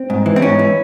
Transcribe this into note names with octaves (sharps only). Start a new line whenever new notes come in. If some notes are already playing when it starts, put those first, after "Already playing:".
Already playing: C4
G#2
E3
C4
G#2 C#4
E3